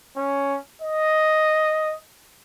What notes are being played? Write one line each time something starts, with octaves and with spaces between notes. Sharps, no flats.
C#4
D#5